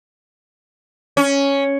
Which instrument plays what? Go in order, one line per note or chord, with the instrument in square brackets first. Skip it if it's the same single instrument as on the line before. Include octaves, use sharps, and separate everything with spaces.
[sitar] C#4